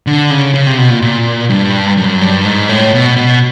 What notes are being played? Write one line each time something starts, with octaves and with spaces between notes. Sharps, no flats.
D3
C#3
C#3
C3
B2
A#2
A#2
G2
F#2
G2
G#2
A2
B2
B2